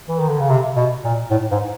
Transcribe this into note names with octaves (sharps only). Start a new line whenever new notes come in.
E3
D#3
D3
C#3
C3
B2
A#2
A2
G#2